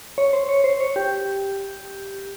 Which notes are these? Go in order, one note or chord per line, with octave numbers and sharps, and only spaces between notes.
C#5
C5
C#5
C5
C#5
G4